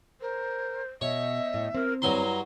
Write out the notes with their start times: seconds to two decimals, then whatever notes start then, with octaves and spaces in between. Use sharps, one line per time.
0.21 A#4 C5
1.01 B2 C#5 D#5 E5
1.54 A2
1.75 C4 A#4
2.02 G2 F#3 E4 A#5 C6